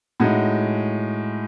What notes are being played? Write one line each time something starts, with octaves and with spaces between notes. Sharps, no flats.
A2 G#3 D#4 F#4